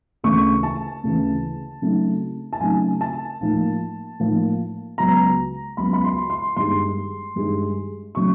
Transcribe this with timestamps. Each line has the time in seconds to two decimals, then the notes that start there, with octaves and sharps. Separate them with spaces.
0.24 D2 C#3 E3 C#6
0.63 A5
1.03 D2 C#3 E3
1.82 C#3 F#3 A3 C4 D#4
2.53 A5
2.61 C#3 F#3 A3 C4 D#4 G#5
3.01 A5
3.41 A2 F3 A#3 D#4
4.20 A2 F3 A#3 D#4
4.98 C#2 C#3 F#3 B3 A#5
5.77 C#2 C#3 F#3 B3 B5
5.93 B5
6.04 C6
6.30 C6
6.57 G2 D#3 G#3 C6
7.36 G2 D#3 G#3
8.15 C#3 F#3 A3 C#6